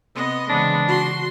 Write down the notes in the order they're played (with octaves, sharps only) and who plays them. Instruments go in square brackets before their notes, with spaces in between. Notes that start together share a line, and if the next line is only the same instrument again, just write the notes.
[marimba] C3 C4 [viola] B3 D#5
[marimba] C#3 E3 C5 [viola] G#3 B3 [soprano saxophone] D4
[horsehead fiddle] F#4 [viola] C6